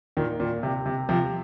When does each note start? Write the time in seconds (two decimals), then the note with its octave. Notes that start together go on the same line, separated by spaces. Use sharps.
0.17 A#2 D#3
0.40 A#2
0.63 C3
0.86 C3
1.09 C3 F3